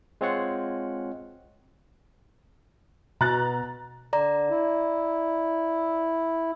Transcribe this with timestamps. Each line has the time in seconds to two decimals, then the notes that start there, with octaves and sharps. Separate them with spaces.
0.21 G#3 C4 F4 C#5 F#5
3.21 B2 A#5 F#6 A6
4.13 D3 D5 A#5
4.50 E4